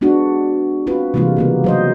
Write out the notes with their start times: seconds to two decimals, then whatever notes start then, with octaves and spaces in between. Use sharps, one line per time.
0.01 G#3 B3 D4 F#4
0.87 C4 F4 F#4 B4
1.14 C3 E3 G3 G#3 A#3 F4
1.37 C#3 A#3 B3
1.64 F#3 C5 D#5